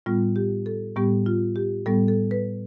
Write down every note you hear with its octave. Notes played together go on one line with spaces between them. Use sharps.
A2 G3 B3 F4
G4
A4
A2 G3 B3 G4
F4
G4
A2 G3 B3 A4
A4
B4